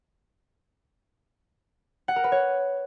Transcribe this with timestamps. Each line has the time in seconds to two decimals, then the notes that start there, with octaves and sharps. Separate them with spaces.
2.08 F#5
2.16 A#4
2.24 B4
2.32 C#5